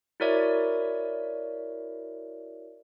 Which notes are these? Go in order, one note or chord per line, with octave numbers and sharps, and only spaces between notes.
E4 F#4 A#4 C#5 D5 E5